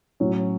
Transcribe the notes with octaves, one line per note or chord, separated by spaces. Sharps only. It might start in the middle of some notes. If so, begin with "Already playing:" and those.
A2 F#3 C#4